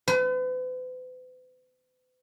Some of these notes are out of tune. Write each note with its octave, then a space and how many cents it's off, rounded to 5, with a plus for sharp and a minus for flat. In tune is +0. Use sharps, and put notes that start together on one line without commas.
B4 +45